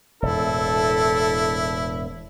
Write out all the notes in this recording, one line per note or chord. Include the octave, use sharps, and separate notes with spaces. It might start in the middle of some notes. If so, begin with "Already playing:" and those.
E1 A2 E4 A4